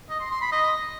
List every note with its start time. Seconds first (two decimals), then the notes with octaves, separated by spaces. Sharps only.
0.10 D#5
0.20 C6
0.31 C6
0.41 B5
0.52 D#5